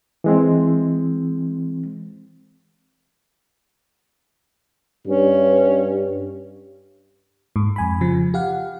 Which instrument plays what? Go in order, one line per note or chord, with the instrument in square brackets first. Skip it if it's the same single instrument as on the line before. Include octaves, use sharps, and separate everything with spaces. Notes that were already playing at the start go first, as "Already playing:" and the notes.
[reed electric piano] E3 G#3 C4
[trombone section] G2 [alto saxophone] C#4
[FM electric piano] G#2
F2 G#5 B5
C#3 F3
G4 F5 F#5